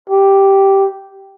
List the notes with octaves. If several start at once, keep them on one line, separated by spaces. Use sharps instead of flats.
G4